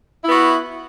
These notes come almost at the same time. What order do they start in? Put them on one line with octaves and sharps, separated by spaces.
E4 B3 F#4